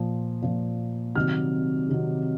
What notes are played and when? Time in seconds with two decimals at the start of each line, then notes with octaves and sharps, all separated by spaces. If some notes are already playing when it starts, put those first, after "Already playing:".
Already playing: A#2 F3
0.42 A#2 F3
1.15 C3 D#3 F#3 F6
1.89 C3 D#3 F#3